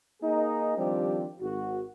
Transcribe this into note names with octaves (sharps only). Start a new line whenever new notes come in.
A#3 D#4 G#4
D#3 F3 G3 C4 D4 G4
G#1 F#4